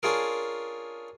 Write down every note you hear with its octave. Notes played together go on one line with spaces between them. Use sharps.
C#4 D4 F4 G#4 A#4